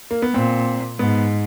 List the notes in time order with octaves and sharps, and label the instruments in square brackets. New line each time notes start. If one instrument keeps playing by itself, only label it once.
[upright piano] A#3
B3
[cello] A#2 [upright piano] C4
[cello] G#2 [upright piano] B3